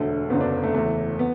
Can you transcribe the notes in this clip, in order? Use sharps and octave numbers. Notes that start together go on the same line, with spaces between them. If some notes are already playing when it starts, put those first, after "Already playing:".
Already playing: E1 D2 D3 A3
F#1 F#2 D3 B3
D4
A3
F#1 E2 E3 A3
B3